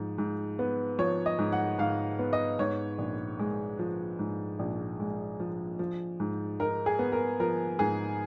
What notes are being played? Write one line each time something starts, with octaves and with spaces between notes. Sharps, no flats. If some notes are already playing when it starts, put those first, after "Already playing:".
Already playing: G#2 F3
G#2
B3
F3 C#5
D#5
G#2
F#5
G#2 F5
B3
D#5
G#2 C#5
A#1
G#3
F3
G#2
A#1
G#3
F3
F3
G#2
D#4 A#4
G#4
B3
A#4
F3 A#4
G#2 G#4